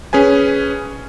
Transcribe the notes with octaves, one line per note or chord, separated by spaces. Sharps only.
C#4 G#4 B4 G#5